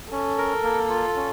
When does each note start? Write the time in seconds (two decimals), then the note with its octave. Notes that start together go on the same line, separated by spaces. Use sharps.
0.11 C#4 A4
0.38 A#4
0.64 A#3
0.90 F4
1.16 C#4